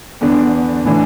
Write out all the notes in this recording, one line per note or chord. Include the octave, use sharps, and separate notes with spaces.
E2 D3 B3 D4
A2 E3 D4